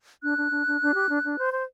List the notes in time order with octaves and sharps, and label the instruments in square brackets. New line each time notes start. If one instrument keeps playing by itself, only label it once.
[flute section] D4 F#6
D4
D4
D4
D4
G4
D4
D4
C5
C5